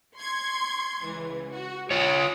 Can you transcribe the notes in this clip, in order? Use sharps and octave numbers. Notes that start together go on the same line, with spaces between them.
C6 C#6 G#6
C#2 E3
F#4
F4 C#5 G#5 D#6